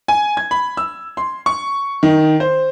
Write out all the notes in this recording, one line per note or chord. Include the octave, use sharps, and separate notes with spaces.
G#5
G#6
B5
E6
C6
C#6
D#3
C5